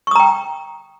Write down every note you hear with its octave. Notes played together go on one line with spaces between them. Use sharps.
G5 A#5 C#6 D#6